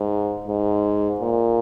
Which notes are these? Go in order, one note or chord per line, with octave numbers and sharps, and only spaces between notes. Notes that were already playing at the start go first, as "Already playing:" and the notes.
Already playing: G#2
G#2
A#2